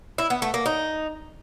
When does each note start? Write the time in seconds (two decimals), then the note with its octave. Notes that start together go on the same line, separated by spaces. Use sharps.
0.18 E4
0.30 B3
0.42 A3
0.54 A#3
0.66 D#4